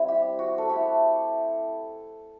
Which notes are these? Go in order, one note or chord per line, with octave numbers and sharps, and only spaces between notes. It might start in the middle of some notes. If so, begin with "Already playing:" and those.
Already playing: G3 C4 E4
G4
F#4
A4
A3 E4 G4